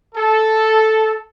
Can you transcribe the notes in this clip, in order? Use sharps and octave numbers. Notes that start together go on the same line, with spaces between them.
A4